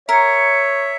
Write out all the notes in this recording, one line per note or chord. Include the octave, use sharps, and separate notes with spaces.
A#4 C#5 E5